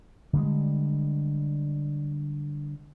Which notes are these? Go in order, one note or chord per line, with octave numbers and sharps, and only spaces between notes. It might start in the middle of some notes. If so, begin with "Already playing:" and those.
D3 G3 G#3